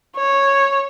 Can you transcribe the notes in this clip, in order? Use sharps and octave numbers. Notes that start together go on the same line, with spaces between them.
C#5